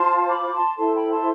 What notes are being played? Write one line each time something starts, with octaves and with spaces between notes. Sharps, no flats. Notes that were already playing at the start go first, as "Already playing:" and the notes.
Already playing: F4 C5 A5 C6
B5 D6
A5 C6
E4 A4 C5 A5 C6
G5 B5
A5 C6